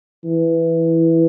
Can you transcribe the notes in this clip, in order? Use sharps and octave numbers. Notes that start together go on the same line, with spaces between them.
E3